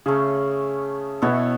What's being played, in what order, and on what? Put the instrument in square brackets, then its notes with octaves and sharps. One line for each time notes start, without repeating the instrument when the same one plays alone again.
[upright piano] C#3 [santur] A3 C#4 G#4
[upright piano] B2 [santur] B3 E4 A4 C#5